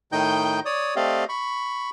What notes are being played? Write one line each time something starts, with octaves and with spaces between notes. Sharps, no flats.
A2 D#3 D#4 D#5 G5 G6
C#5 D5 D#6
A3 C4 G4 D5 D#5 F5
B5 C#6